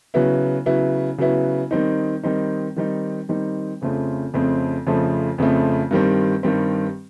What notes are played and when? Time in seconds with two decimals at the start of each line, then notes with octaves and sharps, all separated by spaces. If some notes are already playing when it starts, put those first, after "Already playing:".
0.14 C#3 F#3 B3 E4
0.66 C#3 F#3 B3 E4
1.18 C#3 F#3 B3 E4
1.71 D#3 G3 C4 D#4
2.23 D#3 G3 C4 D#4
2.77 D#3 G3 C4 D#4
3.29 D#3 G3 C4 D#4
3.81 F2 C#3 F3 A3 C4
4.34 F2 C#3 F3 A3 C4
4.87 F2 C#3 F3 A3 C4
5.38 F2 C#3 F3 A3 C4
5.91 G2 D#3 G3 C4
6.43 G2 D#3 G3 C4